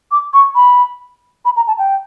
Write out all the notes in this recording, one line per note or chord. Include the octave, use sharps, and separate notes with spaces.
D6
C#6
B5
B5
A#5
A5
G5